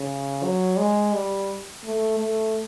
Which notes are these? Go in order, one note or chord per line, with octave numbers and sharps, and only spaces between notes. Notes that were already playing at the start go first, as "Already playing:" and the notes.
Already playing: C#3
F#3
G#3
G3
A3
A3